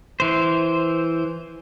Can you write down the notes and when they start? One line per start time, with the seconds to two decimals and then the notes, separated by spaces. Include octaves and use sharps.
0.20 E3 C5